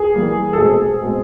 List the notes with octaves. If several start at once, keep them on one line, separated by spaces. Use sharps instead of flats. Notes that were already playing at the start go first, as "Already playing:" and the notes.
Already playing: G#4
E3 G3 A#3
A4
B2 G#3 C4 G#4
B2 G#3 C4